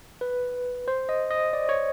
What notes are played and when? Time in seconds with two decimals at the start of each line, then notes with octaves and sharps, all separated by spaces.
0.21 B4
0.88 C5
1.09 D#5
1.31 D#5
1.53 D5
1.69 C#5